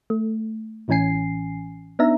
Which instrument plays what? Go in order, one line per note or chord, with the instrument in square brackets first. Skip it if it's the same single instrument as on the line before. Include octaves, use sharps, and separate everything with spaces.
[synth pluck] A3
A1 A2 E3 C#4 G#5 C7
B3 D4 D#4 E5 A#5